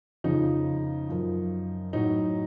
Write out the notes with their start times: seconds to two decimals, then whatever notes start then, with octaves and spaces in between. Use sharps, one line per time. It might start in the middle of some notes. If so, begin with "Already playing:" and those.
0.24 F2 C#3 F3 D#4
1.09 F#2 F3
1.93 A2 F#3 D#4